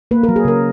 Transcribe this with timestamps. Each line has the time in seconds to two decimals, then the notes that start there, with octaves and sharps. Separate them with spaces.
0.11 A#3 B4
0.23 A#4
0.29 F#3
0.36 G#4
0.45 C#3 A#4